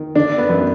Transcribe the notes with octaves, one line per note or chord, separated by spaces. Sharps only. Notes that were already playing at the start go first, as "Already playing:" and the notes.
Already playing: D#3
D3 D4
B3
F#2